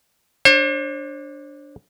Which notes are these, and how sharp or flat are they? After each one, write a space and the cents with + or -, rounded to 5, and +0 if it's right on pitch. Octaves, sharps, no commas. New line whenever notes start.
D4 +0 C5 +45